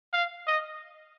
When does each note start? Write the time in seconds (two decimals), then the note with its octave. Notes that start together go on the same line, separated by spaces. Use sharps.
0.13 F5
0.47 D#5